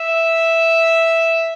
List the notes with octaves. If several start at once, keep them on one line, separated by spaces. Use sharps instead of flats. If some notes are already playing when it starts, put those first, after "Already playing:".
Already playing: E5